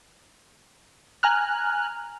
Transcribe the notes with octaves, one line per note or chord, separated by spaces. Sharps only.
G#5 A#5 F6 F#6